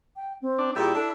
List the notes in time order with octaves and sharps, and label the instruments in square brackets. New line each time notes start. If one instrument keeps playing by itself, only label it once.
[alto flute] G5
C4
[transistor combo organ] D4
[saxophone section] A#2 G3 G4 [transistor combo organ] E4 [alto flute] G#4
[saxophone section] D4 [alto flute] A4